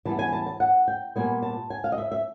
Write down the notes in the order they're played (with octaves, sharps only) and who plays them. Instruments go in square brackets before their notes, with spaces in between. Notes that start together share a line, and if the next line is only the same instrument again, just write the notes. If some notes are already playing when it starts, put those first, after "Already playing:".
[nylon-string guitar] E3 G3 B3 A5
G#5
A5
A5
F#5
G5
A#2 G3 B3 G#5
A5
G#5
F5
D#5
E5
E5